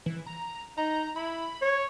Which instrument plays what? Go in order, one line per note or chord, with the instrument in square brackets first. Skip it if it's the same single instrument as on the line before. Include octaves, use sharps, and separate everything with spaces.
[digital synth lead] E3
A#5
[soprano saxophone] D#4 [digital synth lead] A#5
[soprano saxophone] E4 [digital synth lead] B5
[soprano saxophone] C#5